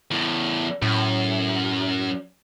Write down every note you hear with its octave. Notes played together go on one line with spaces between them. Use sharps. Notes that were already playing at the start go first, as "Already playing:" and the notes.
E2 A2
F#2 A2